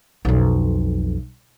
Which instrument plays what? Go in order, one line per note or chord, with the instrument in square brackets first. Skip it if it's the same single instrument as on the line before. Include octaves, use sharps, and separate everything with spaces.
[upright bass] B1 F2